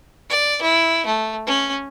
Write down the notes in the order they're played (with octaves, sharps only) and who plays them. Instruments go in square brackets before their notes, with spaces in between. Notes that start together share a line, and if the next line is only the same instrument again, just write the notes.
[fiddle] D5
E4
A3
C#4